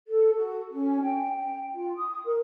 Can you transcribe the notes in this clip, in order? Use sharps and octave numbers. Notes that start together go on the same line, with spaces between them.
A4
F#4
C#4
G5
G5
F4
D#6
A#4